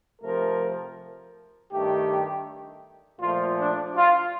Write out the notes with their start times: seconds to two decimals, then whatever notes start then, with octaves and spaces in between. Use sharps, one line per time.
0.21 C3 F3 A3 A#4
1.71 G2 D#3 A3 G4
3.20 A#2 F3 A3 F4
3.59 D4
3.96 F4